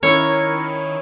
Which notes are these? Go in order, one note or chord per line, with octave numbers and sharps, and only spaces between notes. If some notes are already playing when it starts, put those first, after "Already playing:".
D#3 C#4 E4 A#4 C#5